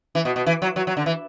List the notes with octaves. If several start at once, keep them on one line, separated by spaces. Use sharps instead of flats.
E3
B2
B2
E3
F#3
F#3
F#3
D3
E3